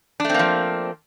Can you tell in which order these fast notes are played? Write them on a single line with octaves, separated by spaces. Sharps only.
D4 A3 C4 A#3 F3